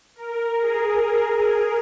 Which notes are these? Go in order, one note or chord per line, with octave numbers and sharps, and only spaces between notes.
A#4
G#4